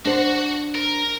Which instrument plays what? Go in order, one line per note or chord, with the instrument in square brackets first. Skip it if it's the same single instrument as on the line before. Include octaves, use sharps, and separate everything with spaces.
[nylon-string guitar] D4 C5 [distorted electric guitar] F#4 F#5
[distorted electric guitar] A#4